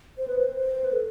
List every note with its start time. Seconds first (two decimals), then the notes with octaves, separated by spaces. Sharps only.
0.18 C5
0.28 B4
0.39 C5
0.56 C5
0.84 B4
0.93 A4